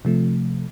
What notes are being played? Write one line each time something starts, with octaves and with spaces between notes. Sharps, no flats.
C3 F3 A3